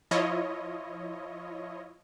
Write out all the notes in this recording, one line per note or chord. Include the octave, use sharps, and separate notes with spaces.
F3 E4 F4 C#5 D#5